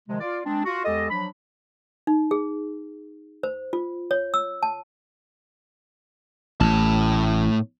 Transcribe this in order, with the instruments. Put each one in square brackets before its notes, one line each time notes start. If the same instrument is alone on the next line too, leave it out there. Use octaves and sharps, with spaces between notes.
[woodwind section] C3 D#3 F3 G#3
F4 D5
G#3 C4 D4
F4 F#4
E2 G#3 G4 A4 D#5
F3 F#3 D4 B5
[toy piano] D#4
G#4
C5
F4
C#5
E6
A5
[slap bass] A1 [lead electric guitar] A2 A5